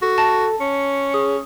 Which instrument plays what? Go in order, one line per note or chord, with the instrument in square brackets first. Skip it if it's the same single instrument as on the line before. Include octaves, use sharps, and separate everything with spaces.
[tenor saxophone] F#4 [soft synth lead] A4
[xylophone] A5 A6 A#6
[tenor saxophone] C#4 [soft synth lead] C#7
[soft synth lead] G#4 [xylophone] D#6